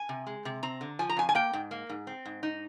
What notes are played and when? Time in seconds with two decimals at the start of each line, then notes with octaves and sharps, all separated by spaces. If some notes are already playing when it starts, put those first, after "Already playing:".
Already playing: G#5
0.09 C3
0.27 G#3
0.45 C3
0.63 C4 A#5
0.81 D3
0.99 F3 G#5
1.09 A#5
1.17 F2 G#5
1.29 G#5
1.35 A#3 G5
1.53 G#2
1.71 A#3
1.89 G#2
2.07 C4
2.25 G#2
2.43 D#4